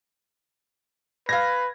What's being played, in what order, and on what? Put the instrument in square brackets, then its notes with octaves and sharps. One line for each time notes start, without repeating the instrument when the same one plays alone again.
[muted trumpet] B4 [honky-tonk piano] F5 G#6 A#6